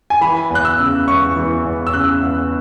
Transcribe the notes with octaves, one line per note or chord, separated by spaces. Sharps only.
G#5
E3 B5
E2 F#6
E6
C#3
E2 C#6
E3
E2
E6
C#3 F#6
E2